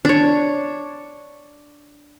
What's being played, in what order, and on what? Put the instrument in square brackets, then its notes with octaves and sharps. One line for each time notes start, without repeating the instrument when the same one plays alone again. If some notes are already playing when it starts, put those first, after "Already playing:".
[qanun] D4 C#5